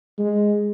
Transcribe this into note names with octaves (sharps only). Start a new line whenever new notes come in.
G#3